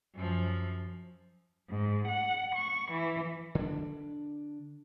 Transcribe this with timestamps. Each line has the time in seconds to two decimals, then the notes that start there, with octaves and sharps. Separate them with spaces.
0.16 F#2 F3
1.70 G#2
2.07 F#5
2.55 C#6
2.91 E3
3.55 D3 D4